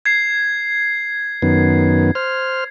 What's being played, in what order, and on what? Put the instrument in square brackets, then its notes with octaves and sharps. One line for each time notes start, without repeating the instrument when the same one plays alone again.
[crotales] G#6 C7
[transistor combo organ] F#2 D#3 B3
C5 F6